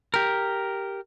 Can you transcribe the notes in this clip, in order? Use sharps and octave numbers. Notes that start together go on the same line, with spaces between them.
G4 A#4